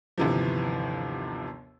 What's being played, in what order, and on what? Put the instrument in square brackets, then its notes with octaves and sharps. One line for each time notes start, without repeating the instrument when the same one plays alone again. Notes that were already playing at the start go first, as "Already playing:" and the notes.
[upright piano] G1 D#2 C3 E3 F3